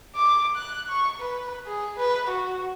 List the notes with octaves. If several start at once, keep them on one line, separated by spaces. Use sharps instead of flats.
D6
F#6
C#6
B4
G#4
B4
F#4